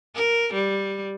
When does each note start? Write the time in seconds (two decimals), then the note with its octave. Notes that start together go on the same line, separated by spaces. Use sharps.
0.15 A#4
0.53 G3